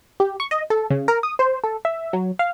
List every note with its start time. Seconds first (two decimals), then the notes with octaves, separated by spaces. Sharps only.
0.20 G4
0.40 C#6
0.51 D#5
0.70 A4
0.90 C#3
1.08 A#4
1.23 D#6
1.39 C5
1.64 A4
1.85 E5
2.13 F#3
2.39 F5